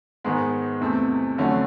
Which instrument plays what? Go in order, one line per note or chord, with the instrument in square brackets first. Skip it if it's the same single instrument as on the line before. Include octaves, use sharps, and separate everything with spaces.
[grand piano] G#2 D#3 G#3 B3
E2 C3 E3 A3 C4
F2 D3 F#3 A3 C#4